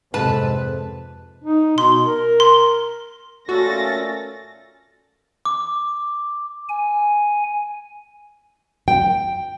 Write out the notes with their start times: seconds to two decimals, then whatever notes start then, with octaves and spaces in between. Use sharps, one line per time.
0.14 F2 G#2 C3 G#3 A4 B4 A5
1.43 D#4
1.78 B2 C6
2.05 A#4
2.40 C6
3.49 A#2 A3 C#4 F#4 A4 A6 A#6
5.45 D6
6.69 G#5
8.88 G5